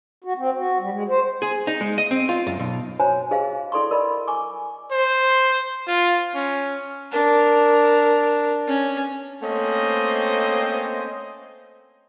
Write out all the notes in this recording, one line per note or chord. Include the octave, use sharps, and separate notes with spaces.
F#4
C4
F#4
G3
G#3
C5
G#4
D#4
G#3
D#5
C4
F4
F#2
B1
F#4 C5 C#5 G#5 A#5
G4 G#4 C5 D#5 F5
E4 A4 D5 C6 C#6
A#4 D5 D#5 B5
G#5 C#6 D6
C5
F4
C#4
D4 A#4
C#4
A3 A#3 C4 C#4 C5 D#5